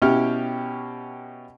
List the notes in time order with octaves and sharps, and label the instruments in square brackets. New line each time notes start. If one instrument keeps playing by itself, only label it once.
[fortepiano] B2 C#4 E4 G4 F6